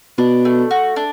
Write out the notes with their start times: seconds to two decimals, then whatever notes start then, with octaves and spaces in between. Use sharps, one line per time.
0.18 B2 D4
0.45 A3
0.71 F#4
0.96 D4